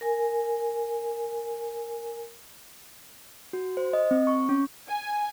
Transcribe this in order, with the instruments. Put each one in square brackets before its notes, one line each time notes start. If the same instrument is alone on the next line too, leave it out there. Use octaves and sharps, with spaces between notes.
[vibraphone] A#4 G#5
[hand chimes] F#4
C5
D#5
C4
C#6
C#4
[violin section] G#5